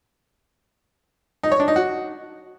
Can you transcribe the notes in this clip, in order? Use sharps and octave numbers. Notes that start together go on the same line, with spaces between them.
D#4
C#5
D4
D#4
F#4